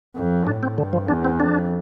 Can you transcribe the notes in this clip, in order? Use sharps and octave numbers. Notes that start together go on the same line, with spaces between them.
F2
A2 D4
C4
G2 D3
F3
E2 D4
C4
F2 D4